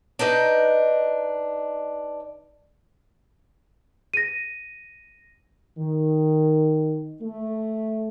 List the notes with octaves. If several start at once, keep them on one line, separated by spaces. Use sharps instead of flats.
D4 D#4 B4 D#5
A#6 D#7
D#3
A3